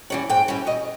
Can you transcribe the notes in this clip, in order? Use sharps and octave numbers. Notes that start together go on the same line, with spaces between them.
E3 G3 C#4
G#2 G5
E3 G3 C#4
B2 D#5